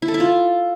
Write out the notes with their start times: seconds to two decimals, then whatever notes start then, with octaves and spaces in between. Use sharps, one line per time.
0.02 E4
0.08 A4
0.14 E4
0.20 F4